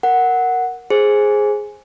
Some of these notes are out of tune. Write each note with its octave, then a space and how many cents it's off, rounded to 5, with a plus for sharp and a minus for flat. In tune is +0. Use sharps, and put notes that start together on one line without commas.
A#4 +0 F#5 +0
G#4 +0 C5 +15 G#5 +0